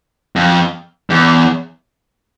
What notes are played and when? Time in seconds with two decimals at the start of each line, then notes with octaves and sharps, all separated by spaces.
0.36 F2
1.10 E2